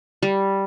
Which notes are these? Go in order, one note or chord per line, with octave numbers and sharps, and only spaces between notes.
G3